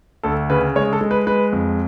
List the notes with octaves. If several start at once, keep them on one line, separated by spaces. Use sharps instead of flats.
D2 A4
C#3 B4
G#3 C#5
A4
G#3
B4
G#3 B4
F2